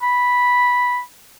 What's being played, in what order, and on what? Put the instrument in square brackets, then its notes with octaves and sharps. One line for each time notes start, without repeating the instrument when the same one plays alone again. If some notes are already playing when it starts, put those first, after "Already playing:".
[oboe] B5